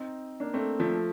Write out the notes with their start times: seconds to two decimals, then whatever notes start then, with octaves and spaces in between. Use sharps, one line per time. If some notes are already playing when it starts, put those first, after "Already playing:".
Already playing: C4 D#4
0.40 A#3 D4
0.54 A3 C4
0.80 F3 A3